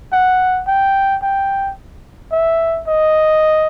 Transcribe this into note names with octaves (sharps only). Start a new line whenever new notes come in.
F#5
G5
G5
E5
D#5